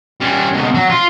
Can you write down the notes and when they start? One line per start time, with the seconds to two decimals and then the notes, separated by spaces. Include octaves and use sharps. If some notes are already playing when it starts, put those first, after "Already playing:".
0.20 G3 C#4
0.53 C#2 B2
0.75 F#3
0.90 F4